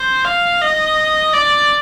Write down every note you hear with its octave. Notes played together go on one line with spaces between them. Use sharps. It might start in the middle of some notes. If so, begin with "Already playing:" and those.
Already playing: C5
F5
D#5
D5